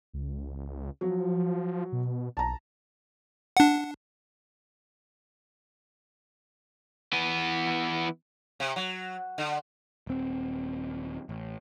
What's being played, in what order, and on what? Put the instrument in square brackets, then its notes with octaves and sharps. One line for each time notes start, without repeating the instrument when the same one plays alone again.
[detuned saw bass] C#2
[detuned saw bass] F3 [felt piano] F#3
[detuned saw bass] B2
[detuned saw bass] B1 [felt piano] A5 A#5
[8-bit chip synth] D4 F#5
[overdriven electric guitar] E3 B3
[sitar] C3
F#3
D3
[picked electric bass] D#1 C4
A1